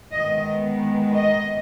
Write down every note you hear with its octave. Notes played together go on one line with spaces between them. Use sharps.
D#3 G#3 B3 D#5
D#5